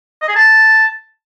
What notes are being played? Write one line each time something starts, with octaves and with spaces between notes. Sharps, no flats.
D#5
G#4
A5